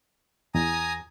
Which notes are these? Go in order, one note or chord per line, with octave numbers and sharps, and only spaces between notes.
E2 G#5 A#5 D#6